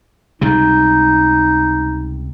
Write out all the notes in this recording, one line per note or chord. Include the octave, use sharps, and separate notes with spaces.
C#2 C3 G3 D#4